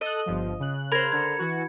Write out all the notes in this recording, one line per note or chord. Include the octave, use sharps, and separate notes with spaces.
A4 D#5 D#6 F#6
G1 G2 F3
C#3 F#6
A#4 C5 B5 G#6
D3 G#6 C#7
E3 F#4 C#7